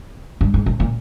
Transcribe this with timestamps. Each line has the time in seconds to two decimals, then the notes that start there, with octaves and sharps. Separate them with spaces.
0.41 G2
0.54 G#2
0.66 A2
0.80 A#2